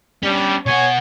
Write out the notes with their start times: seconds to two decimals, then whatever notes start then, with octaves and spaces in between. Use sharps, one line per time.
0.23 G3 C#4 D4
0.66 B2 C#5 F#5 G#5